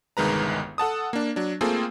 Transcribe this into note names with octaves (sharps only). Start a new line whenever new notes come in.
G1 C2 D#3 G#3 B4 A#5
A4 F#5 A5 D#6
A#3 D4
F#3 D4
A3 A#3 C4 F4 G#4 A4